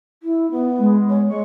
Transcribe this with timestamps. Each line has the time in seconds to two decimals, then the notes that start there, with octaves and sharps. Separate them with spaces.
0.23 E4
0.51 B3
0.79 G#3
1.09 C#5
1.29 G#3 C#6